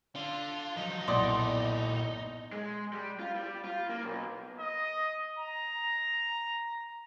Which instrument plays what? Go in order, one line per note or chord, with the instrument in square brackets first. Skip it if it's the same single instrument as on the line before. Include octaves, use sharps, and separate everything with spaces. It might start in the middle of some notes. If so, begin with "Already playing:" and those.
[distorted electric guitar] D3 [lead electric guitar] F4
[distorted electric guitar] F3 F#3 [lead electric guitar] D#4
[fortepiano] B1 D5 F#5 [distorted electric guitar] A#2 E4 [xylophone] C6 D6 D#6
[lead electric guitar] G#3
G3
F4
G3
F4
A#3
B1
[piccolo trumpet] D#5
A#5